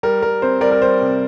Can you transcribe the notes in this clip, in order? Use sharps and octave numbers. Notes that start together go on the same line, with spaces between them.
G3 A#4
G3 A#4
C4 C5
G3 A#4 D5
A#4
G3 C5
C3